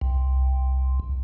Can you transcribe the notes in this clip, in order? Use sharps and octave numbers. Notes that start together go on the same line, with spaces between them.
C2